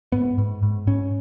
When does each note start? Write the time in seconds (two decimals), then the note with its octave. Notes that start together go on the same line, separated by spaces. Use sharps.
0.12 G#2 B3
0.38 G#2
0.63 G#2
0.87 G#2 C#4